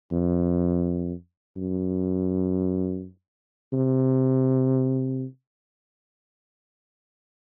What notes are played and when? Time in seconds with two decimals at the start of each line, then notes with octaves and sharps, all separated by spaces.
0.12 F2
1.56 F#2
3.73 C3